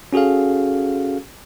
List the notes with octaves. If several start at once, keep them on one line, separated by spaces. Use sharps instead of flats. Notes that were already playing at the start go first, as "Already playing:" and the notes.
C#4 F#4 G#4 A4 F5